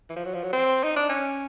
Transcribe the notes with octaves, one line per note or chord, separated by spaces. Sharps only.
E3
F3
F#3
F3
F#3
C4
D#4
D4
C#4